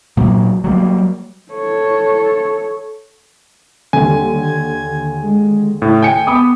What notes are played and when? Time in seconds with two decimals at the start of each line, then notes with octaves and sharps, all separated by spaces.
0.17 A#2 F#3
0.64 F#3 G3 A3 A#3
1.52 A4 C#5
3.93 D#2 D3 G3 G#5
4.42 G#6
5.22 G#3
5.82 A2 C#3
6.02 G5 G#5 C#7
6.27 B3 B5 D6 D#6